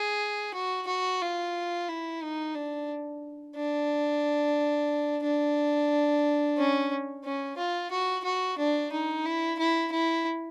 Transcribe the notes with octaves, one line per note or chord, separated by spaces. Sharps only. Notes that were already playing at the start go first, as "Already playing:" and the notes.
Already playing: G#4
F#4
F#4
F4
E4
D#4
D4
D4
D4
C#4
C#4
F4
F#4
F#4
D4
D#4
E4
E4
E4